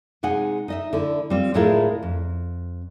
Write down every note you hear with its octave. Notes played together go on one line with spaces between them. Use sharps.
C3 G#3 D#4 F#5 G#5
D#4 D#5 E5
D3 E4
G3 C4 F4
D2 A2 G#3 E4 F4 A#4
F2